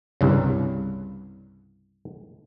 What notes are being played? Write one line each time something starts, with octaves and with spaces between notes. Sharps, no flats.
C2 G2 C#3